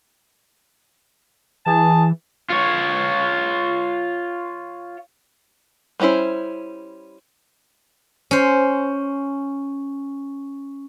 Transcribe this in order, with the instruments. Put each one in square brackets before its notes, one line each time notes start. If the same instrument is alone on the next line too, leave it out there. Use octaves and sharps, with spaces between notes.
[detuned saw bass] E3 [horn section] G#4 A5
[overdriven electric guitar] F4 C#5
[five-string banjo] G3 A#3 C#4 E4 C5
[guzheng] C#4 C5